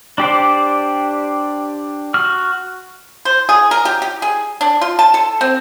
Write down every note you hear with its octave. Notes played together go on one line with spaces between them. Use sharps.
D4 G4 C5 D5
F#4 F6
C5
G#4
A#4
G4
G4
G#4
D4
F4
A5
A4
C4